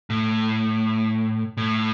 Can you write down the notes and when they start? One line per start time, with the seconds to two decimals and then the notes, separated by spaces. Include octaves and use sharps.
0.10 A2
1.57 A2